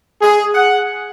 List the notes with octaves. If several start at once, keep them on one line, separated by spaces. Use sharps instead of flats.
G#4
F#5